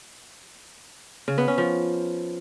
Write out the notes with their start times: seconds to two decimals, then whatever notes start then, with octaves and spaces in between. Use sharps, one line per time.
1.28 C#3
1.38 B3
1.48 C#4
1.58 F3